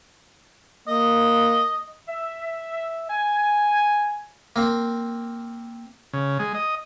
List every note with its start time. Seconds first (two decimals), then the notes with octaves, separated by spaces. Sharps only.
0.88 A#3 D#5
2.09 E5
3.10 G#5
4.56 A#3 C4
6.13 C#3
6.39 G#3
6.54 D#5